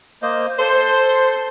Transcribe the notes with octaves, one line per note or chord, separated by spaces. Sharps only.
A#3 C5 D#5
A4 C5 C6